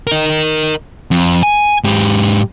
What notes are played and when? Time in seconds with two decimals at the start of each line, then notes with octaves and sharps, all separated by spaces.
0.07 A#4 D#5
1.11 F2
1.43 G#5
1.84 G#2 G4